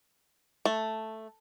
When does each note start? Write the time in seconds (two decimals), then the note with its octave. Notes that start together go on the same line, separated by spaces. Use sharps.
0.65 A3